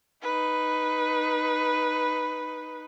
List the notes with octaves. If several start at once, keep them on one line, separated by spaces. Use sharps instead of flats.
D#4 B4